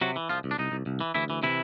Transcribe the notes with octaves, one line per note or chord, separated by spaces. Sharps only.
C3 F#3 F#4
E3
C2 F3 F4
C2
D4
C2 D#4
C2
C2
E3
D2 E3 E4
E3
C3 E3 E4